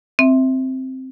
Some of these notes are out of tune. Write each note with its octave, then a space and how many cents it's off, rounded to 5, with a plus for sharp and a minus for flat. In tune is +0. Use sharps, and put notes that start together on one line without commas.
C4 +0 E5 -10